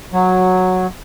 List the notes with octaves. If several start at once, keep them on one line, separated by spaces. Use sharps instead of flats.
F#3